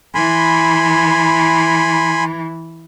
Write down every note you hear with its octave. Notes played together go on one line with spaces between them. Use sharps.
E3 G#5 B5 C6